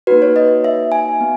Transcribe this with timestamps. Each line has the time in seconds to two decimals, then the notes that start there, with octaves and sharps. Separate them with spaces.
0.07 A#3 D#4 F#4 B4
0.22 C#5
0.36 D#5
0.64 E5
0.92 G#5
1.21 B3